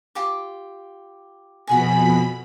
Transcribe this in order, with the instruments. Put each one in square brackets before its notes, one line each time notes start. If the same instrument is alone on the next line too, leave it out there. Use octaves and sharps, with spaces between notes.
[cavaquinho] F4 G4 D6
[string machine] F2 B2 B5 [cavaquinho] F#4 G#4 G#5